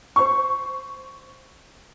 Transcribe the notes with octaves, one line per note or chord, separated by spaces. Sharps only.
C5 C#6